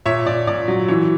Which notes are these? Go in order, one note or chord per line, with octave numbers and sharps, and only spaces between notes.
A#2 C#5 E5
A#2 D5
A#2 D5
F#3
E3 C#5